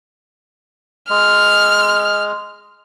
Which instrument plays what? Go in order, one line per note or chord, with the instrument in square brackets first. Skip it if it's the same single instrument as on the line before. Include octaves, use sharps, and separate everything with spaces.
[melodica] G#3 [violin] F6